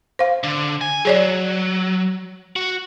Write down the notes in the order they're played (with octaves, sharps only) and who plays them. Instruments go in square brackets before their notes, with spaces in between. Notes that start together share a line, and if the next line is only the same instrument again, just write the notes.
[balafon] C5 F5
[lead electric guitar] D3
G#5
[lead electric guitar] F#3 [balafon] G#4 C#5 D5
[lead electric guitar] F#4